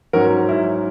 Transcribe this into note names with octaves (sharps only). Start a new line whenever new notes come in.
G#2 F#3 C#4 F#4 A#4
E4